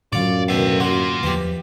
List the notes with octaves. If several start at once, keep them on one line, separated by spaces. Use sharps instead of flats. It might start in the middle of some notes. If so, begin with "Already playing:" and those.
F#2 A2 D3 F#3 F4 C#5 D5
B2 D#3 A3 A4 F5
A#3 F4 F#4
E2 E3 F3 G4